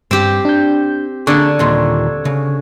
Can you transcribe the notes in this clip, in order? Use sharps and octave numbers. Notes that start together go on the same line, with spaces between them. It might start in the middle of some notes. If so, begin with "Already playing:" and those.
G2 C4 G4
D4 G6
D3 A#3 D4 G#4 C#6 G#6
D#2 A#2 C6
C#3